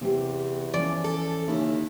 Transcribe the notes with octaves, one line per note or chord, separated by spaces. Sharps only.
E2 C3 C4 G4
E3 F3 C#4 D5
A4
D#2 C#3 E4